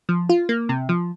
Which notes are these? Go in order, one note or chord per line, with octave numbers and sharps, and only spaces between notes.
F3
F4
A#3
C3
F3